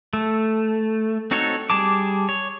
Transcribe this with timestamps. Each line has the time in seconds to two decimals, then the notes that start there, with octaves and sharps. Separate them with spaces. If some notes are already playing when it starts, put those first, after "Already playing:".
0.13 A3
1.31 C4 D#4 F#4 A4 C#5
1.70 G3 G#4 A5 D6
2.29 C#5